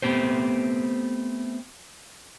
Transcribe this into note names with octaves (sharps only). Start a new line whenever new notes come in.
A3 B3 C4 G4 C5